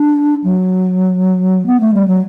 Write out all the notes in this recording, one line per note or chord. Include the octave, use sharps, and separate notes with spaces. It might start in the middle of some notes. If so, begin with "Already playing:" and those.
Already playing: D4
F#3
B3
A3
G3
F#3